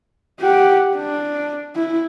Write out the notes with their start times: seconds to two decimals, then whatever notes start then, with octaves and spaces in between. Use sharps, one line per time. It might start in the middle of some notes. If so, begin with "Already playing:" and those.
0.40 G4 F#5
0.96 D4
1.75 E4